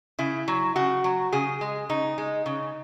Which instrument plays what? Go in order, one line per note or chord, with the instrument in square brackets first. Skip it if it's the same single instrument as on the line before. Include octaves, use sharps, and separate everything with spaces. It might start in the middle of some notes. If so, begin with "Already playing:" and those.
[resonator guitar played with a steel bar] C#3 E4
F#3
C#3 F#4
F#3
C#3 G#4
G#3
C#3 D#4
G#3
C#3